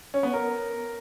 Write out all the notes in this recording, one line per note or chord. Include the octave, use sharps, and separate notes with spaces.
C#4
B3
A#4